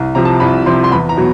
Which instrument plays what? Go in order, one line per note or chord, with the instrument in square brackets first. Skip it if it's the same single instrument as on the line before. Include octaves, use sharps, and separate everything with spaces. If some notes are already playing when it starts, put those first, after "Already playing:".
Already playing: [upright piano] C2
C3 F3 A#5
A5
A#5
C2 B5
C3 F3 C6
C6
E2 B5
A#5
B2 F#3 B3